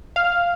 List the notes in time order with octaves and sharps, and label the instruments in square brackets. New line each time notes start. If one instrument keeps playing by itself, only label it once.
[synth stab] F5